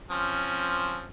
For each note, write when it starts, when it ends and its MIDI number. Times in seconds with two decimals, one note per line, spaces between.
0.11 1.08 53
0.11 1.08 60
0.11 1.08 61